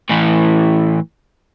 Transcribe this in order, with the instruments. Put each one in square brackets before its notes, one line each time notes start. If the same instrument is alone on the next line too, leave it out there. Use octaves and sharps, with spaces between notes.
[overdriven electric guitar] A2 E3